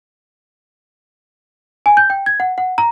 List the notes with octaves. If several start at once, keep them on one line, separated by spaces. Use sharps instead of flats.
G#5
G6
G5
G#6
F#5
F#5
A#5